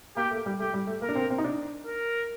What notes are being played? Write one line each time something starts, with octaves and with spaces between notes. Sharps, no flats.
A#3 G4
A3
G3
A3 G4
G3
A3
A#3 A#4
D4
C4
C4
D#4
D4
A#4